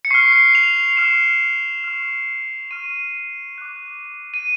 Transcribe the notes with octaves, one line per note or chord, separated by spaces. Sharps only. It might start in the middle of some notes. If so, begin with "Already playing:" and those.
C#7
C#6 F6 C7
C7
F7
F7
C#6 F6 E7
C#6 F6
C#6 F6 D#7
D6 F#6
D#7